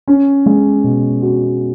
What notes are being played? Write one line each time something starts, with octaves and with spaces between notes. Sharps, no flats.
C#4
G#3
B2
F#4